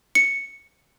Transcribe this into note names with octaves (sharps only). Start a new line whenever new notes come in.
C#7